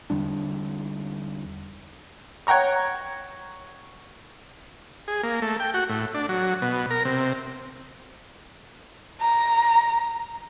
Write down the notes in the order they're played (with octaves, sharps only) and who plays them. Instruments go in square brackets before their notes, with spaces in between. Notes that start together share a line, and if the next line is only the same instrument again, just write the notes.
[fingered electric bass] E2 D3 G3 D4
[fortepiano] C#5 F#5 G5 A#5 C#6
[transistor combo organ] G#4
A#3
A3
G5
F#4
A2
D4
F#3
B2
A#4
C3
[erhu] A#5